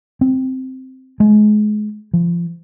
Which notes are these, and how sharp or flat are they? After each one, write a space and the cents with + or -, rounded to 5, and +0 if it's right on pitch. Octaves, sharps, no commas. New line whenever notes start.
C4 -5
G#3 +30
F3 -30